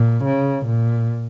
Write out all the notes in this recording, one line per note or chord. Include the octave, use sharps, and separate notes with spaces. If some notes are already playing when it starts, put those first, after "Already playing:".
Already playing: A#2
C#3
A#2